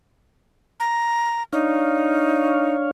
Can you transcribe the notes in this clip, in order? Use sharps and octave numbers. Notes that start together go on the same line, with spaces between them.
A#5
D4 D#4 C#5 F5